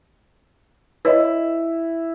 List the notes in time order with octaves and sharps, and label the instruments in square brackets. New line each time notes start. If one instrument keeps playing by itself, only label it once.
[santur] E4 [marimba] B4 C#5 D#5